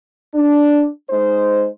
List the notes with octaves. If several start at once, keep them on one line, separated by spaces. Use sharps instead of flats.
D4
G#3 D#4 C5